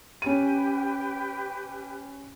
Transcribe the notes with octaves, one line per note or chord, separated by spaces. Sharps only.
C#4 G4 B4 G5 D#7